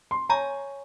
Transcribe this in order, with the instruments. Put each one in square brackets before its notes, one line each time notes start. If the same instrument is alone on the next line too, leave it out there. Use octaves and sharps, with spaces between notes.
[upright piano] C6
[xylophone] C#5 G#5 C#6 G6 [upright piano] A#5